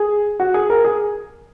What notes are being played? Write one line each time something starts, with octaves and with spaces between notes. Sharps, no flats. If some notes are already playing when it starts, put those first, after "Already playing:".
Already playing: G#4
F#4
G#4
A#4
G#4